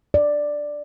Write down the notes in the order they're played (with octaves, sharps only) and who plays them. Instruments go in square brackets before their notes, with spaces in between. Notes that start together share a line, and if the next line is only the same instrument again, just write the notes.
[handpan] D5